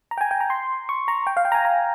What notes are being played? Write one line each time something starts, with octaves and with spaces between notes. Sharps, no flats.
A#5
G5
G#5
G5
A#5
C6
C#6
A#5
G5
F5
G5
A#5
G#5
A#5